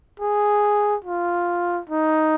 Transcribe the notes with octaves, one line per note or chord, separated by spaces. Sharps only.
G#4
F4
D#4